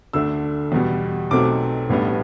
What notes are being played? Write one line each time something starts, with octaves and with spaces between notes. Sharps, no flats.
D2 D3 A3 D4 E6
E2 B2 G3
B1 B2 F#3 A3 C4 D6
A1 A2 G3 B3 D4